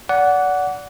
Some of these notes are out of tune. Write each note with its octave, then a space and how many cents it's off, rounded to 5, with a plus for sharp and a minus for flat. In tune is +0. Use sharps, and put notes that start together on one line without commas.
D5 -30 F#5 +0